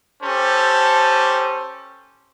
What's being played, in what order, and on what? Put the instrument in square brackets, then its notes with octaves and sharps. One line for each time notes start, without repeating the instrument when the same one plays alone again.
[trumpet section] C#4 G4 A4 C5 A5